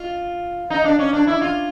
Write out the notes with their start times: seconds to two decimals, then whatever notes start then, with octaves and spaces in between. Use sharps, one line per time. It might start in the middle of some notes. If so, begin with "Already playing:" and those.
Already playing: F4
0.70 D#4
0.84 D4
0.99 C#4
1.13 D4
1.27 E4
1.41 F4